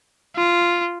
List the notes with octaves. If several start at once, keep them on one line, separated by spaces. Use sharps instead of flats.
F4